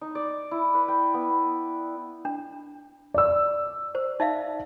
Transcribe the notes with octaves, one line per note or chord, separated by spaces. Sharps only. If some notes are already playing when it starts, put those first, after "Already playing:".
D#4
D5
E4
B4
G5
B3
D4
D5 E6
C5
D#4 E5 F5